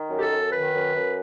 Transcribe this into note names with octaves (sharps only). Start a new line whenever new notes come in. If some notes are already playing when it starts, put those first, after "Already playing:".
Already playing: D#3
F#2
G4
A4
F#2
D#3 B4
F#2
F#2